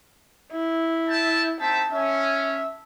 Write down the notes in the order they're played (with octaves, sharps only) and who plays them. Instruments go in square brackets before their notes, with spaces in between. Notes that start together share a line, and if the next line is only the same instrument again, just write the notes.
[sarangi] E4
[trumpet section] E5 G5 A5
[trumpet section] C4 D#4 E5 [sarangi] A5
[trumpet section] C#4 [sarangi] E5